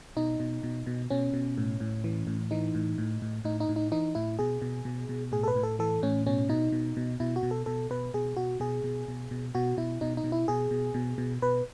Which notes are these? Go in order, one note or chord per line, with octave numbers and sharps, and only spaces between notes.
B2 D#4
B2
B2
B2
B2 C#4
B2
A2
A2
E3
A2
E3 D#4
A2
A2
A2
A2 D#4
D#4
A2
D#4
E3 D#4
A2 E4
B2 G#4
B2
B2
B2
A2 G#4
A4
B4
A2
A4
E3 A4
A2 C#4
B2 C#4
B2 D#4
B2
B2
B2 E4
F#4
B2
A4
B2 A4
B2 B4
B2 G#4
B2 F#4
B2 G#4
B2
B2
B2
B2 F#4
B2 E4
B2 D#4
D#4
B2
E4
B2 G#4
B2
B2
B2
B2 B4